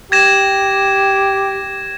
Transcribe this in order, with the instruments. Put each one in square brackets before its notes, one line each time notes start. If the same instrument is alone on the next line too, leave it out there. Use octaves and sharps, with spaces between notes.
[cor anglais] G4 [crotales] G#6 A#6 E7